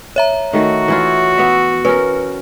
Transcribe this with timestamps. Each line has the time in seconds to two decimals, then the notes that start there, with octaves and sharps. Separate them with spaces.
0.16 C#5 E5 A#5
0.53 D#3 A3 F#4
0.88 E3 E4 F4
1.38 B3 E5
1.85 C#4 A#4 B4